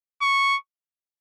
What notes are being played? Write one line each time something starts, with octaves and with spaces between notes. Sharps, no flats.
C#6